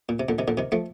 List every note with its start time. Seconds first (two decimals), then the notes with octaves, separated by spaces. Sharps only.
0.09 A#2
0.20 C3
0.29 A#2 D3
0.39 C3 D#3
0.48 A#2 D3
0.57 C3 D#3
0.72 F3 A3